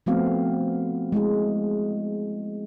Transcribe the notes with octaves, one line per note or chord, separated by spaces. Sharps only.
F3 A3 B3 C4 F#4 F5
G#3 A3 E4 G#4